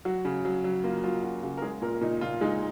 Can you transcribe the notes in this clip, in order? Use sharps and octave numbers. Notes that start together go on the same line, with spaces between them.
F#3 F#4
C#3
F#3
F#3
A#3 F4
F#3 F4
C#3 F#4
C#3 F#4
A#4
G#3 G#4
A#2 A#4
A#2 D#4
A#2 F4
G#3 D#4